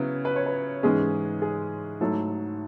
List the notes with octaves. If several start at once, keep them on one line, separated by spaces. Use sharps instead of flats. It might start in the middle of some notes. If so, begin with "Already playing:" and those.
Already playing: C#3 F#3 B3 E4
B4
C#5
B4
G#2 E3 G#3 C#4 G#4
G#4
G#2 F#3 A3 E4 A4